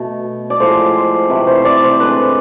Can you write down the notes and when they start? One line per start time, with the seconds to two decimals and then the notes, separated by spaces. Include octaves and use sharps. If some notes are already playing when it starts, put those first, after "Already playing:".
Already playing: B2 A3
0.50 D5
0.60 A2 F3 G#3 C5
1.29 C3 E3 A3 B4
1.47 C5
1.65 D5
1.83 C5
2.00 D3 G#3 B4